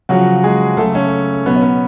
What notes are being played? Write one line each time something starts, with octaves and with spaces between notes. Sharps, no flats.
C#3 F3 F#3 F#4
G#3 G#4
C#3 F#3 A3 A4
C#4
B2 F#3 B3
C#4
B3